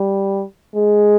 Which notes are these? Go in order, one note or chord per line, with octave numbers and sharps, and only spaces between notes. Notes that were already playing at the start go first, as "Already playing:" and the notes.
Already playing: G3
G#3